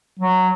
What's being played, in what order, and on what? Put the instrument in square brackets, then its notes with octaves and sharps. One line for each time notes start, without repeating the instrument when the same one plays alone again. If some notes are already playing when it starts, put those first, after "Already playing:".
[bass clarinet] F#3